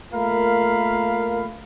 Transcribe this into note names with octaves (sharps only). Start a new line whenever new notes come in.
A3 A#3 F4 A#4 F5 B5